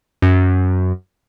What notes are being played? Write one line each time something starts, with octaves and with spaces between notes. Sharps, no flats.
F#2